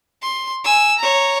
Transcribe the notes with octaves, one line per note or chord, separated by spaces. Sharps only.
C6
G#5 E6
C#5 A#5